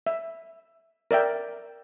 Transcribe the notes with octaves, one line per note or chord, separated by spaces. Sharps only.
E5
A#4 D5 E5 G5